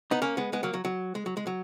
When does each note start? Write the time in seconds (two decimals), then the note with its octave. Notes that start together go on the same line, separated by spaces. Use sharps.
0.11 B3 D#4
0.22 A#3 C#4
0.37 G#3 B3
0.53 G#3 B3
0.63 F#3 A#3
0.74 F#3
0.85 F#3
1.15 G#3
1.26 F#3
1.37 G#3
1.47 F#3